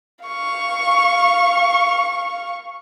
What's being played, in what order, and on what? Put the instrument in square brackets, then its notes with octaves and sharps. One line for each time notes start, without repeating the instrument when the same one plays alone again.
[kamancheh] F5 C#6